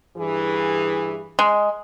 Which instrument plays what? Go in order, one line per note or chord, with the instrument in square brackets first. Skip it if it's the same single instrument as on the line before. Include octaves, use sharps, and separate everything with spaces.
[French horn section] G2 E3 G#4
[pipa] G#3